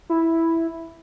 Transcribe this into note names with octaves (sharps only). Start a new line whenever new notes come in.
E4